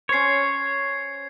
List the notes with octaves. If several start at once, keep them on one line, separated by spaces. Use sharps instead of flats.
C#4 C5 C#5 G#6 C7